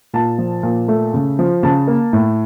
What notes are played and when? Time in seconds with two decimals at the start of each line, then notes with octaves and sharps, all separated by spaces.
0.14 A#2 A5
0.38 F3
0.63 A#2
0.88 A3
1.14 C#3
1.39 F3
1.63 C#3 A5
1.87 A#3
2.13 A2